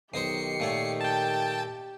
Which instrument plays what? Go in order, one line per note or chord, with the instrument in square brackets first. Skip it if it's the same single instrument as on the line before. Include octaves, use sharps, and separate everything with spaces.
[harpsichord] B1 D#4 C5 [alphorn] D#3 [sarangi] G4 [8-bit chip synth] C7 C#7
[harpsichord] A#2 A3 C#5
[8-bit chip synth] G5 A5